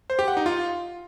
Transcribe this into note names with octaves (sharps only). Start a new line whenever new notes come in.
C5
G4
F#5
D#4
F4